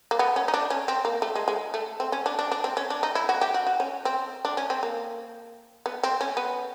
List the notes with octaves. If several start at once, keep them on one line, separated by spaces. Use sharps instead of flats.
A#3
B3
C#4
D#4
D4
C#4
C4
A#3
A3
G#3
G#3
A3
C4
C#4
D4
D4
D4
C4
C#4
D4
D#4
E4
F#4
G4
F#4
F#4
C#4
C4
D4
C#4
C4
A#3
B3
C4
C#4
B3